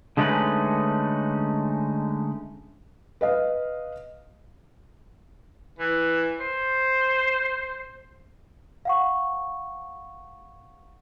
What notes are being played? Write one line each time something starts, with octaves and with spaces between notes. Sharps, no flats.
D3 G#3 A3 C#4 D#4 B4
B4 D#5 F5
E3
C5
F5 F#5 C#6